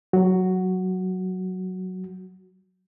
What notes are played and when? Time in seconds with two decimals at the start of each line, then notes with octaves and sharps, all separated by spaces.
0.13 F#3 F#4